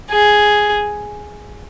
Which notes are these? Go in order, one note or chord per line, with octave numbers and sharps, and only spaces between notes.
G#4